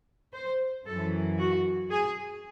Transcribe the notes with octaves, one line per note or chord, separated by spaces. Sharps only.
C5
F#2 E3 A4
F#4
G#4